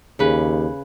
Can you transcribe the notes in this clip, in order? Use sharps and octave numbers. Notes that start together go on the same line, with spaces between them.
D#2 C#3 B4